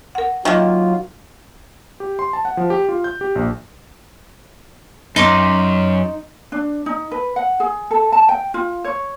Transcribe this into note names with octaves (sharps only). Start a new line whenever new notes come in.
A#4 F#5
D#3 F#3 A#3 F4 E5 F5
G4
C6
A5
F#5
F3
G4
F4
G6
G4
A#1
F#2 D#4 C6 D6
D4
D#4
B4
F#5
G#4
A4
A5
G5
F4
C#5